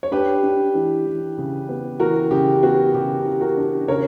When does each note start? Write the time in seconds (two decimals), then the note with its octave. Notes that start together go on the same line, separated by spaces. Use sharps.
0.03 C#5
0.11 D4 G4 B4
0.43 D4
0.75 E3
1.06 E3
1.38 C#3
1.69 B3
2.00 E3 F#4 A#4
2.31 C#3 G4
2.63 B3 F#4
2.94 C#3 G4
3.25 E3
3.41 F#4 A#4
3.57 D4
3.88 C#3 A#4 C#5